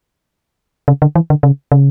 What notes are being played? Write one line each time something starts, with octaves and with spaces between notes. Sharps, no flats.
C#3
D3
E3
D3
C#3
C#3